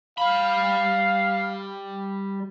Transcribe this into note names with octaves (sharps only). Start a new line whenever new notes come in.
G3 F5 B5